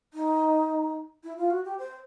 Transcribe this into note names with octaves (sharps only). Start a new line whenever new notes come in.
D#4
E4
F4
F#4
G4
C5